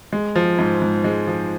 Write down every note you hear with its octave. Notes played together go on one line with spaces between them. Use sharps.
G#3
F3
G#2
G#2
G#3
F3